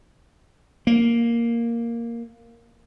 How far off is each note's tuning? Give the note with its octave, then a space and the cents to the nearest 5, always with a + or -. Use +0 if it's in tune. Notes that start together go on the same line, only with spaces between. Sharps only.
A#3 +0